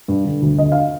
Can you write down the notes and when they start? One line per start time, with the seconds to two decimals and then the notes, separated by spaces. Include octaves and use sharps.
0.08 G2
0.25 D3
0.42 D2
0.58 D3 D#5
0.72 F5